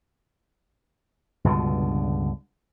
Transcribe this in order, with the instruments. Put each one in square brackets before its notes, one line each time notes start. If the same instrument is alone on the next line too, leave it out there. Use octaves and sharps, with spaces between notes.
[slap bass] C#2 G2 B2 D3